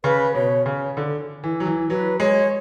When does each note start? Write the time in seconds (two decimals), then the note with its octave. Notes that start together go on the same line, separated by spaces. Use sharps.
0.04 C#3 B4
0.34 B2 C#5
0.66 C#3
0.97 D3
1.44 E3
1.60 F#3
1.66 E3
1.89 F#3 B4
2.19 G#3 C#5